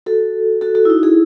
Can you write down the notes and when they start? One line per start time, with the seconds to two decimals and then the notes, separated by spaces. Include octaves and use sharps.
0.06 F#4 A4
0.61 F#4 A4
0.75 F#4 A4
0.85 E4
0.90 D#4 F#4
1.03 E4 G#4